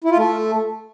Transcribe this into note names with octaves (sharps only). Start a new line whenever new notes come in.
E4
F4
A3